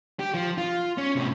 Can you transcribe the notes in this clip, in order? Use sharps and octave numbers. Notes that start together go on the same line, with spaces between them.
G4
F3
F4
C#4
A2 C3